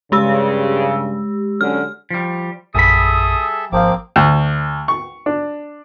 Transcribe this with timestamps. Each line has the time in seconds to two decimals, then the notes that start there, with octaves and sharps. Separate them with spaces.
0.12 G2 C#3 G#3 G4 E6
1.61 D3 F#3 C#4 F6
2.11 F3 G3
2.75 A#1 F#2 G3 G#4 A4 E5 B5 D#6
3.72 G#1 F3 A#3 C4 F5 D6
4.16 D2
4.88 C#6
5.26 D4